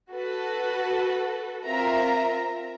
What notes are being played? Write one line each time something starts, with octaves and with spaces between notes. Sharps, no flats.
F#4 A4 B4
C4 F4 A#4 E5 A#5